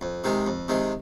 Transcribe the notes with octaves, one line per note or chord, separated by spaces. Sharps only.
F2
C3 D#3 G#3
F2
C3 D#3 G#3